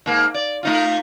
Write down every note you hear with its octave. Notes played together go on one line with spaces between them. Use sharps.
G#2 A#3
D5
A3 D#4 F4